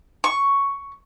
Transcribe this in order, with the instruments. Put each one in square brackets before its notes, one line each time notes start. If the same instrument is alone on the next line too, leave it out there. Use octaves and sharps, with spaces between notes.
[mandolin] C#6